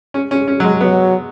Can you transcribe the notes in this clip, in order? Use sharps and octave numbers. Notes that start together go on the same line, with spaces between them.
C#4
C#4
C#4
F#3
G#3
F#3 B3